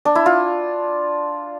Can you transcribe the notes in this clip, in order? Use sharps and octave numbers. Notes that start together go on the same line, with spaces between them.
D4
E4
F4